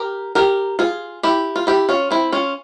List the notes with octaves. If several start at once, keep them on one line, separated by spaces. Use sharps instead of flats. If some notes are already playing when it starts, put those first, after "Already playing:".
Already playing: G4 A#4
G4 A#4
F4 G#4
E4 G4
F4
E4 G4
C#4 F4
C4 E4
C#4 F4